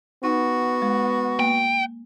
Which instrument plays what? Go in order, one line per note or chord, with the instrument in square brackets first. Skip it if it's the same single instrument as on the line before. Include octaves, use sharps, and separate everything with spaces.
[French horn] B3 [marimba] D#4 [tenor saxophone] F#4
[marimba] G#3
[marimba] A#3 [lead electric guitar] G5